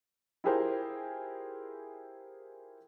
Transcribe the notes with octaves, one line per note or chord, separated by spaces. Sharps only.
E4 F4 G4 G#4 A#4 C5